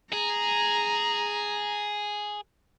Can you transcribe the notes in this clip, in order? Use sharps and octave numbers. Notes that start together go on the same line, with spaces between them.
G#4 A#5